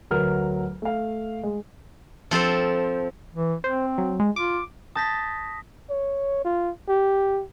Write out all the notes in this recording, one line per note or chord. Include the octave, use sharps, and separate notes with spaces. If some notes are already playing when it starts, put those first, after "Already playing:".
D2 F#3 A#4 B4 F6
A3 F5
G#3
F3 C4 A4 C5
E3
C4 C5
F#3
G#3
F4 D6
A5 D#6 G6 A#6 B6
C#5
F4
G4